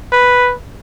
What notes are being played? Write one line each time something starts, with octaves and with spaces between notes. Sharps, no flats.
B4